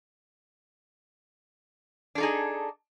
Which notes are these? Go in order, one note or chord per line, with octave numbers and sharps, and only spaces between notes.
D4 D#4 G#4 A4